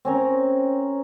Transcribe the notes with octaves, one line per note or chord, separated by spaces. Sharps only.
C4 C#4 A#4